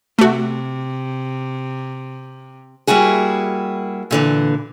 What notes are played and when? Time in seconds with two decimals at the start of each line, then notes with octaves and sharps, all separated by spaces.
0.19 C3 A3 F#4
2.87 G3 A#3 E4 F#4 G#4
4.11 A#2 D3 E3